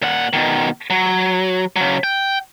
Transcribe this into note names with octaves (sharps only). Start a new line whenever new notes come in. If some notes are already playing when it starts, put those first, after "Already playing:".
A#2 F#5
B2 D#3
F#3
C#3 F#3
G5